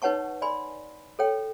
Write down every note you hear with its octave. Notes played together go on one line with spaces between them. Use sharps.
D#4 B4 C#5 F#5 A5 C#6
D5 G#5 B5 C6
A4 C#5 G5